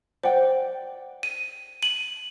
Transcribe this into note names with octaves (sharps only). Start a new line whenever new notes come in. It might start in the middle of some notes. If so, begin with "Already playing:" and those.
C5 D5 F#5 G5
D#7
D#7 F#7